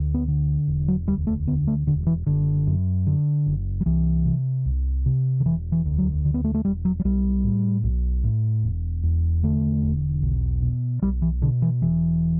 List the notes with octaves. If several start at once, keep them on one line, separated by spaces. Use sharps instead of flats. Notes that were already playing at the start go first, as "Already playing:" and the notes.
Already playing: D2
B3
D3
E1
F#3
D2 G3
A3
D3 B3
A3
E1 D3
E3
F#1 D3
F#2
D3
F#1
F#3
C2 E3
C3
C2
C3
D3
E1 E3
E3
D2
F#3
D3
B3
A3
A3
E1 G3
F#3
F#3
B1 G3
A2
B1
A2
E1
E2
D3 A3
E1
B1
B2
B1 G3
E3
B2 D3
E3
E1 E3